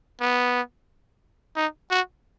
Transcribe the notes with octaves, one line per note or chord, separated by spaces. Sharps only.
B3
D#4
F#4